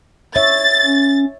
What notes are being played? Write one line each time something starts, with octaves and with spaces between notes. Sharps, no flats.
C#5 E5 A6
C#4